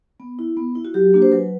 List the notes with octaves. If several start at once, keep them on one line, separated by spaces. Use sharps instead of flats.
B3
E4
B3
E4
F#4
F#3 G4
A#3 D4 F#4
C5
F#3 B4